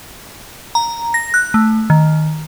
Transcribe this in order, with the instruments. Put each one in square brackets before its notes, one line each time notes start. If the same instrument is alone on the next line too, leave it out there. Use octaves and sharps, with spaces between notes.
[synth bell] A#5
A#6
F#6
A3
D#3